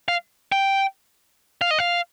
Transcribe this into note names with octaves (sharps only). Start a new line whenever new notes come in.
F5
G5
F5
D#5
F5